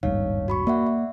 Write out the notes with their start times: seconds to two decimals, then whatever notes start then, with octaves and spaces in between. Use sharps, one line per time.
0.03 D#1 G#1 G2 D#4 C#5 F5
0.48 F#4 B5 C#6
0.67 A#3 D5 E5 F#5
0.87 E5